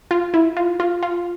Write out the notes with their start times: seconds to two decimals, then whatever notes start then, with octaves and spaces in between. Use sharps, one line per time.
0.11 F4
0.34 E4
0.57 F4
0.80 F4
1.03 F4